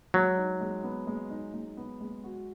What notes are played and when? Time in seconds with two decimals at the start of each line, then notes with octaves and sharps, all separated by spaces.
0.14 F#3 G#3
0.37 D#4
0.61 G#3
0.84 B3
1.07 G#3
1.30 D#4
1.54 G#3
1.77 B3
2.01 G#3
2.24 F#4